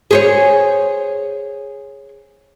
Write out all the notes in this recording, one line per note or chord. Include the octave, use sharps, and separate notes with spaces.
G#4 C5 C#5